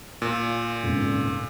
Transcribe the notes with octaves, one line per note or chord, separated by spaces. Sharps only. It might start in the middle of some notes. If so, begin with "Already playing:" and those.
A#2
D#1 G#1 C#3